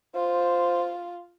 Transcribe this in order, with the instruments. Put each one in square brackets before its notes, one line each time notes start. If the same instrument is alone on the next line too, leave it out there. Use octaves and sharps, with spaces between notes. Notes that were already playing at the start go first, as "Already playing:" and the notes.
[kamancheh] F4 [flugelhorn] C5